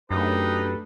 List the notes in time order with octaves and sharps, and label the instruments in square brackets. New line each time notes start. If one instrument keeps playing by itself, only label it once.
[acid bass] F#2 [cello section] A3 D4 [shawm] D#4 [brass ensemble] G4 A4 B4